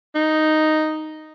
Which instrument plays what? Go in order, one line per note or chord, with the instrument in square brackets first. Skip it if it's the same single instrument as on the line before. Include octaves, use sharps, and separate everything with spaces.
[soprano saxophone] D#4